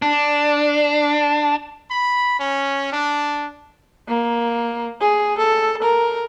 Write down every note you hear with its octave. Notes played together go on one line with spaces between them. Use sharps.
D4
B5
C#4
D4
A#3
G#4
A4
A#4